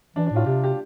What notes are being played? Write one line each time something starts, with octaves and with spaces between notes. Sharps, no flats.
E3 D4
D4
A2 F4
C3 G4
G4